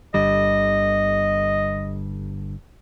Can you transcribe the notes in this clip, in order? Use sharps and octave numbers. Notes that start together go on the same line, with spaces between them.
G1 D3 G3 D#5